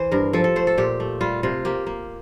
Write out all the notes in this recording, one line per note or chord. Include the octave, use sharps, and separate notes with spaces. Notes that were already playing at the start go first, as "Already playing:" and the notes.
Already playing: E3 C5
G2 A#4
F3 A4
A4
A3 C5
A4
A#2 G4
A3
G3 F4
C3 F4
A#3 G4
A#3